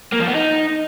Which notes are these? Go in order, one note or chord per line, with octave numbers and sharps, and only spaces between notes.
A#3
F3
B3
D#4